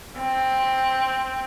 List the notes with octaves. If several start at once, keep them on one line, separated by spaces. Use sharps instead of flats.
C4